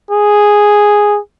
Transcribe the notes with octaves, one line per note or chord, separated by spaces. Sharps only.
G#4